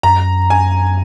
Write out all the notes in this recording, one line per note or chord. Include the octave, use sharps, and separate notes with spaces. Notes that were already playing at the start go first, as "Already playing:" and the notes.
F#2 A#5
G#5